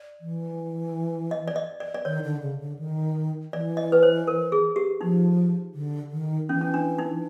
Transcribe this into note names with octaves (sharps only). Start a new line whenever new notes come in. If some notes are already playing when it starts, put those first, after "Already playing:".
Already playing: D5
E3
D#5
D5
D#5
D5
D5
D#3 C#5
D3
C#3
D3
D#3
E3 D5
D#5
B4
C5
A#4
G#4
G4
F3 D#4
D3
D#3
E3 C#4
C#4
D4
D#4